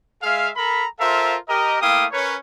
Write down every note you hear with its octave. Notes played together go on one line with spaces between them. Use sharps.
G#3 G#4 E5 F5
A4 A#4 A#5 B5
F4 A4 A#4 C5 E5 F5
G4 A#4 D#5
A3 A#3 E4 F5 G5 D#6
C#4 A#4 B4 C#5